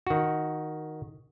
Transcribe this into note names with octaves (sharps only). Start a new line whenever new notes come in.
D#3 F#4